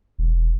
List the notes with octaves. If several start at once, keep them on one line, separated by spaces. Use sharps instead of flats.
E1